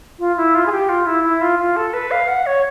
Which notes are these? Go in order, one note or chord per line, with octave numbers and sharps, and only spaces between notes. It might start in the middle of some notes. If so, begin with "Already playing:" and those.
F4
E4
F4
G#4
G4
F4
E4
E4
F4
F4
A4
B4
F5
F#5
C#5